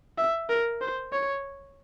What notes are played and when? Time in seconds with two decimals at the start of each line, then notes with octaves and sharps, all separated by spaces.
0.18 E5
0.49 A#4
0.81 C5
1.12 C#5